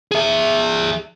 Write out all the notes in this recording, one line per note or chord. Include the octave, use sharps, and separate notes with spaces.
G#4 E5